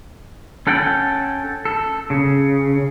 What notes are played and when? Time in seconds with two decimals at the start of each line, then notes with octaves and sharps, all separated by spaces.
0.67 C#4 A4 F#5 G5
1.65 A4
2.10 C#3